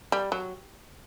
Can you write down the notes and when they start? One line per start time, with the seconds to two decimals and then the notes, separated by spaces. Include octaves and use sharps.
0.12 G3
0.32 F#3